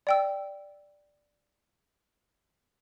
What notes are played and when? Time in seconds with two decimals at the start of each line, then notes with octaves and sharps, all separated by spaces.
0.07 D5 G5 E6